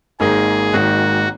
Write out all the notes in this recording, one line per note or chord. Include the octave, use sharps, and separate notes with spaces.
G#1 G#2 D#3 A#3 D#4 G#4
G#1 G#2 D#3 A#3 D#4 F#4